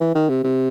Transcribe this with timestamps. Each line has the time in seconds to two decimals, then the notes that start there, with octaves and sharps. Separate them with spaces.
0.01 E3
0.15 D#3
0.29 C3
0.44 C3